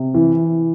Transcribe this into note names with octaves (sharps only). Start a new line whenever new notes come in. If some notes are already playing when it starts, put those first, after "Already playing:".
Already playing: C3
E3